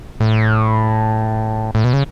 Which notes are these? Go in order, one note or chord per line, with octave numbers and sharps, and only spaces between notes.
A2
A2
B2
C#3